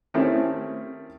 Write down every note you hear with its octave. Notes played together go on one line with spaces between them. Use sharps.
D#3 A3 C4 C#4 E4 G4